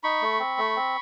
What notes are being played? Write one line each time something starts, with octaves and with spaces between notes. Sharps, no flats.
D#4 B5 C#6
A3
C4
A3
C4